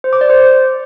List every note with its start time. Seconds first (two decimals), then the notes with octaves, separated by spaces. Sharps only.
0.04 C5
0.13 D6
0.21 D5
0.30 C5